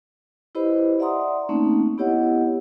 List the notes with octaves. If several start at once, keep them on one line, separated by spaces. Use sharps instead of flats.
E4 G4 B4 C5 D#5 B5
D5 E5 F#5 A#5 C6 D#6
A3 A#3 C4 C#4 D#4
B3 E4 G4 C#5 D#5 F#5